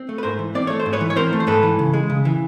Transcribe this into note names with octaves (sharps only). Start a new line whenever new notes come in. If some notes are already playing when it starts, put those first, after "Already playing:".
Already playing: C4
A3
B4
G#2 A#4 C5
E3
C4 D5
A3 C#5
C5
G#2
B4 C#5
E3
C#5
C4 A#4 C5
A3
C5
G#2 A4 B4
E3
C#3
G#3
C#3
E3